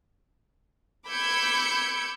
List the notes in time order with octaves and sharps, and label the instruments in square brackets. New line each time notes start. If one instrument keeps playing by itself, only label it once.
[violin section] B5 D6 E6 G6 G#6 C#7